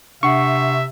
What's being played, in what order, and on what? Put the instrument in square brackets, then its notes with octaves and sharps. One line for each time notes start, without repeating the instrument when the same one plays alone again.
[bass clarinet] C3 [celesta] D4 F#5 C7 [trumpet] E5 [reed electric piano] C#6